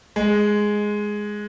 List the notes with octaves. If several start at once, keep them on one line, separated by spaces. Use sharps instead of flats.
G#3